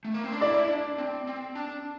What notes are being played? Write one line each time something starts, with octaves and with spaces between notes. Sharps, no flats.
A3
A#3
C4
D4
E4 D5
E4
D4
C4
C4
D4